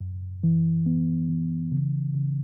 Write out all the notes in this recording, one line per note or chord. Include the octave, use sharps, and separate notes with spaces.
F#2
E3
B3
E3
C#3
C#3